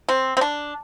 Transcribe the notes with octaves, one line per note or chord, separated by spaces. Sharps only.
C4
C4
D4